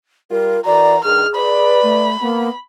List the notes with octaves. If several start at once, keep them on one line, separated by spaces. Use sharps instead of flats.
G3 F4 A#4
E3 F#4 A#4 D5 A#5
G2 D#3 G#4 F6
B4 D5 B5
A3
A#3 B3